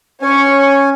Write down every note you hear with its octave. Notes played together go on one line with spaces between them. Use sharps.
C#4 C#5 G#5 C#6